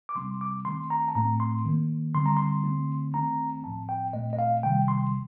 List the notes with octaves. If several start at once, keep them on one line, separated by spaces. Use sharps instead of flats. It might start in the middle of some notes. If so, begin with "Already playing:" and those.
D6
C3 G3 C4 C6
D6
D#3 A3 C4 C6
A#5
A5
A2 A3 C4 A#5
C6
D#3 A#3
D3 G3 C4 C6
A#5
C6
D3 A3 C4
D#3 A3 C4 A#5
A2 F3 C4 A5
G5
A#2 A3 C4 D#5
D#5
F5
C3 D#3 G3 G5
C6